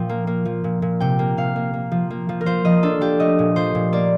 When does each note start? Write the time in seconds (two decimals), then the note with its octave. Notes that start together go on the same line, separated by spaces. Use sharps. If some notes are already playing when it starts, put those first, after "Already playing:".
Already playing: A#2 F3 G5
0.09 A#3
0.27 A#3
0.45 F3
0.64 A#2
0.82 A#2
1.00 C3 G5
1.19 A#3
1.37 C3 F5
1.56 A#3
1.73 A#3
1.92 F3
2.10 A#3
2.29 F3
2.41 A#4
2.46 F3 C5
2.65 F3 D#5
2.83 D4 A4
3.01 F3 G4
3.20 A3 D#5
3.39 A#2
3.56 F3 C5
3.75 A#2
3.93 A#3 D5